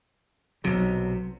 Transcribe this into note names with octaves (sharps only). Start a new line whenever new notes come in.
B1 C3 F#3